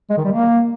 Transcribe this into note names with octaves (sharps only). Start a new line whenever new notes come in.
G#3
D#3
G3
A#3